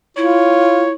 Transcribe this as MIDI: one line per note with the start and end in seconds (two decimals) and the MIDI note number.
0.17 0.92 64
0.17 0.88 65
0.17 0.94 73